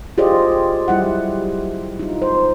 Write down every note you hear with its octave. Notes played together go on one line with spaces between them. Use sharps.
F4 G4 G#4 C5 D5 D#5
F#3 G3 E4 F#5
D#4 F4
C5